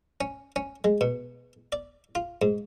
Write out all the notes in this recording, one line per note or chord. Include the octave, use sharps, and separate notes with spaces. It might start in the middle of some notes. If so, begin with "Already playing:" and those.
C#4
C#4
G#3
B2
D5
F4
G#2